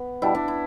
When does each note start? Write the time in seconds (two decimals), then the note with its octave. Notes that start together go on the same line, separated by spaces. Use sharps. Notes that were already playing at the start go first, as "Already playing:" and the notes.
Already playing: B3
0.22 B2 G3 D4 E4
0.35 D4
0.48 E4